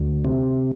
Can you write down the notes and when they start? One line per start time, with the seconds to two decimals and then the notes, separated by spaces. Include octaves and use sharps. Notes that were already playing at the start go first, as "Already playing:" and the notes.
Already playing: D2
0.25 C3